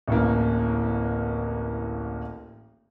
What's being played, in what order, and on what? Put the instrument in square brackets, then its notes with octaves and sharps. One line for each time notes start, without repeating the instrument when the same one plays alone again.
[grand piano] D1 A1 A#3